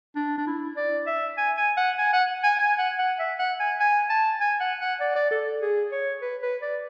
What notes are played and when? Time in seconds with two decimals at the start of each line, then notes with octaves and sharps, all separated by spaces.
0.16 D4
0.38 D4
0.47 E4
0.77 D5
1.07 E5
1.38 G#5
1.57 G#5
1.77 F#5
1.98 G#5
2.13 F#5
2.43 G#5
2.59 G#5
2.78 F#5
2.99 F#5
3.19 E5
3.39 F#5
3.60 G#5
3.80 G#5
4.09 A5
4.41 G#5
4.60 F#5
4.81 F#5
5.00 D5
5.15 D5
5.31 A4
5.62 G#4
5.92 C#5
6.22 B4
6.42 B4
6.62 D5